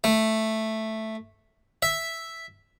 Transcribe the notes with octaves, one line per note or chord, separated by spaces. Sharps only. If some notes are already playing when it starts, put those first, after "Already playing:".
A3
E5